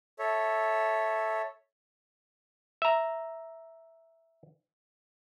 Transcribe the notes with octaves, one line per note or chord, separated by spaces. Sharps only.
A4 C#5 E5
E5 A#5